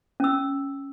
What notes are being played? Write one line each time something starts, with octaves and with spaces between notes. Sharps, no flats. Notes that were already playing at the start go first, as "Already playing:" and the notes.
C#4 E6